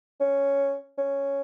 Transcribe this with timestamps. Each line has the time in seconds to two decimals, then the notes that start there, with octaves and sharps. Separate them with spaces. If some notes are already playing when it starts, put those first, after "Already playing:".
0.20 C#4
0.98 C#4